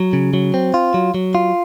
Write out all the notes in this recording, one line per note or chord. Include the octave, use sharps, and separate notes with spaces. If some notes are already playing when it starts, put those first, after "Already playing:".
Already playing: F#3
C#3
F#3
C4
F4
F#3
F#3
F4